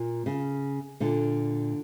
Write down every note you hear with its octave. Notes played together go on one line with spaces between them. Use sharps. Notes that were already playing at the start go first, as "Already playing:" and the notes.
Already playing: A#2
C#3
A#2 D3